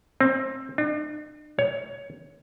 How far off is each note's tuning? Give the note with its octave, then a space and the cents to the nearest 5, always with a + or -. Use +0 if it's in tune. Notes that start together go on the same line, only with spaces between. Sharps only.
C4 +25
D4 +45
C#5 +15